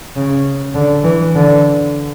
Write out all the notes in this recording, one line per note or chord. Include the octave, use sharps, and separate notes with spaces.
C#3
D3
E3
D3